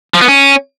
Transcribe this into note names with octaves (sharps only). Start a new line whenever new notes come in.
F3
B3
C#4